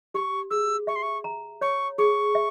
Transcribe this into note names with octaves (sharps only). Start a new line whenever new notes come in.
G4 C#6
G#4 E6
E5 C#6
C6
C#6
A#5
C#5 C#6
G#4 C#6
E5